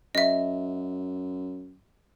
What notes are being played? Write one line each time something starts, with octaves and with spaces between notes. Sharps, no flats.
F#2 D#5 E5